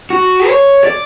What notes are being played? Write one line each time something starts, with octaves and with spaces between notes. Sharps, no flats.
F#4
C#5
D5